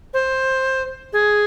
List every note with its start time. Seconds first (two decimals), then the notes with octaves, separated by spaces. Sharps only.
0.14 C5
1.13 G#4